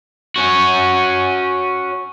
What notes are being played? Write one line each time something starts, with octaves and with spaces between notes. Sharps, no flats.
C#4 F#4